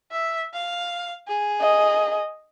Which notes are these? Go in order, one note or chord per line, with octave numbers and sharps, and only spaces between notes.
E5
F5
G#4
D#5